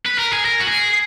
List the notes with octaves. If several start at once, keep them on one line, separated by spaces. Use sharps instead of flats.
B4
A#4
G#4
A#4
F#4
G#4